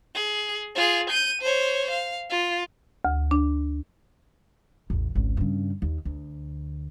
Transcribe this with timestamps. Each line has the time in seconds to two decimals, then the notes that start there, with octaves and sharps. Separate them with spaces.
0.15 G#4
0.75 F4 G#4
1.09 G6 D#7
1.42 C5 C#5
1.91 F5
2.30 F4
3.05 D2
3.31 D4
4.90 A1 E2
5.15 G#1 C#2
5.37 G2 C#3
5.82 D#2
6.05 D2